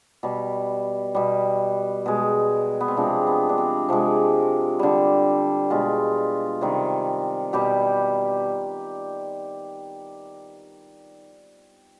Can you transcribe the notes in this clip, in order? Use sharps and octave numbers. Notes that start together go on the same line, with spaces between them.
B2 G3
B2 G3
B2 G#3
B3
C4
C3 F3 G#3 D4
B3
D4
C4
C3 F3 G#3
D3 G3
B2 G#3 F4
C3 D#3 G3
B2 G3 G4